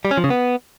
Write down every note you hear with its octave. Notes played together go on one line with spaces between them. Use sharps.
G3
C#4
F3
C#3
B3